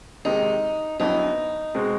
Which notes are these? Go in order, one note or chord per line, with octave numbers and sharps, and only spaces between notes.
F2 C3 D#3 G#3 D#4
F2 D3 F#3 B3 D#4 E4
B2 G#3 C4